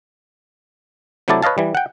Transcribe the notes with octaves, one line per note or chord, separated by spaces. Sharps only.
C3 F#3 A3 E4 D5 A5
B4 C#5 D#5 F5 A5
E3 G3
F#5 G5